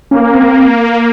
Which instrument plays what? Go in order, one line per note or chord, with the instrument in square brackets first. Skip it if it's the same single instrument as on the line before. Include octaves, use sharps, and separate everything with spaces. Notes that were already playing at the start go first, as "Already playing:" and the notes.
[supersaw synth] A#3 [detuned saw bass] C#4
[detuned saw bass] C4